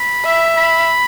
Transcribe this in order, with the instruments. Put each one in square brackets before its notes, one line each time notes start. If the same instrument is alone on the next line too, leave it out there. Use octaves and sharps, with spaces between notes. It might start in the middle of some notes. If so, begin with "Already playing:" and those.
Already playing: [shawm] B5
[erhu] E5
[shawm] B5